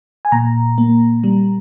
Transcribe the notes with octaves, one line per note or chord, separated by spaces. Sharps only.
G#5
A#2 A#5
A#3
G3